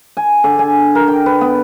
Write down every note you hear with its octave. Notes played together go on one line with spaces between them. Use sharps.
G#5
D3
G#5
A#4
G5
B4
B3